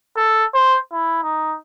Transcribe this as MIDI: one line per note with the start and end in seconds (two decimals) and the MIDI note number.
0.16 0.44 69
0.54 0.77 72
0.92 1.21 64
1.23 1.56 63